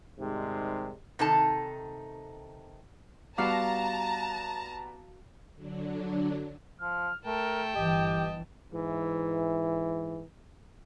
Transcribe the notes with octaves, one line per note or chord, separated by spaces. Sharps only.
G#2 C3 D#3 G3 G#3
C3 D#3 D#4 A4 A5
G3 B3 F#4 F5 A5 A#5 D6
D3 F#3 D4
F3 F6
A3 A#4 G5 A5
G1 E3 G4 D#5
G#2 E3